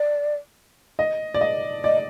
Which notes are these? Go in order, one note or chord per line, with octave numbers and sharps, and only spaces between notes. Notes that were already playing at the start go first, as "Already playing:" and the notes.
Already playing: D5
D#5
D5
D#5
D5 D#5